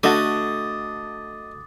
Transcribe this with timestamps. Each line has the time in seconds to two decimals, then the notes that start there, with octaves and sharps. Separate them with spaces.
0.03 D3 A3 F#4 D#5 D6 D#6 A6